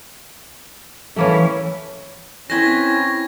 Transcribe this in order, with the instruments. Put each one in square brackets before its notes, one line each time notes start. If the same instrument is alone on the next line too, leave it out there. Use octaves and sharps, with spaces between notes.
[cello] E3 [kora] A3 A#3 C#4
[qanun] C4 B4 C5 [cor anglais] C#4 [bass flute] E4 [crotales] G#6 A#6